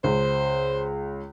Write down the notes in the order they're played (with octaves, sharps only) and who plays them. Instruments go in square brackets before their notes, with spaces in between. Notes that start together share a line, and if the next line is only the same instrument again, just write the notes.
[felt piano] C#2 [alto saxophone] C5